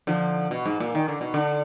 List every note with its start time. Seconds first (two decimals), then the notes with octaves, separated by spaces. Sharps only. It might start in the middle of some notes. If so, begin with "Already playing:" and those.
0.07 D3 F3
0.51 B2
0.66 G#2
0.80 A#2
0.95 D#3
1.08 D3
1.21 B2
1.34 D3